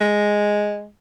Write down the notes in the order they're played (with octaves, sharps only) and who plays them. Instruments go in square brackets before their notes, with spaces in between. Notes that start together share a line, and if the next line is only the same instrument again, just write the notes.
[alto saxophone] G#3